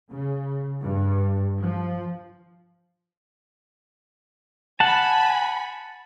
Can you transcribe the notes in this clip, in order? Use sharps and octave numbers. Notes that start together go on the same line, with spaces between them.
C#3
G2
F3
F#5 G#5 A5 B5